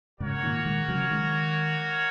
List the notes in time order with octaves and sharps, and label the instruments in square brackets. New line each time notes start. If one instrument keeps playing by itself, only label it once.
[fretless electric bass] G#2 C#3 [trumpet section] A#3 F#4 A#4 C#5
[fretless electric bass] A#2 D#3
D#3 G#3
C#3 F#3
D#3 G#3